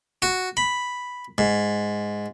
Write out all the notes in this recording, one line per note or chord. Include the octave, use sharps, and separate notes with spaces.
F#4
B5
G#2